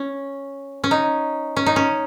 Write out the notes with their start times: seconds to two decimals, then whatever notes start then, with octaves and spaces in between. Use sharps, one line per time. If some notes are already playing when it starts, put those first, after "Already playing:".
Already playing: C#4
0.84 C#4
0.91 D#4
1.56 C#4
1.66 D#4
1.76 C#4